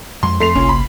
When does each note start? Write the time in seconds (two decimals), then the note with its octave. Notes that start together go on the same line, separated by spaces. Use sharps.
0.23 F2 G#3 C6
0.40 F2 A3 C6 C7 F7
0.55 G1 C2 A#2 A#3 C#4
0.69 B5